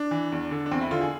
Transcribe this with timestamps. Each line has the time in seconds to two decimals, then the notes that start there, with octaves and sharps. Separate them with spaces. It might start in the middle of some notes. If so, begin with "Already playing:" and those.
Already playing: D4
0.11 E3
0.32 E2
0.51 D3
0.66 D4
0.71 E2 C4
0.81 E4
0.91 D3 F4
1.01 G#4